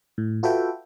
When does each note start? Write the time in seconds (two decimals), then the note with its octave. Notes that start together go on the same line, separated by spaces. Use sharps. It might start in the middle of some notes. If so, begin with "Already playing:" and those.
0.18 A2
0.43 F4 F#4 A4 B4 E5 G5